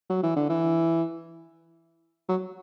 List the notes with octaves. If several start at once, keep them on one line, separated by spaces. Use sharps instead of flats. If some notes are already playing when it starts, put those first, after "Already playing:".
F#3
E3
D3
E3
F#3